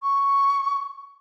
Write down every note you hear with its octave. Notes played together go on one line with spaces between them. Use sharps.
C#6